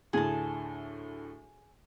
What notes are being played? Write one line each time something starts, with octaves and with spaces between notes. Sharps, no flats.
D2 A2 D3 G#4 A5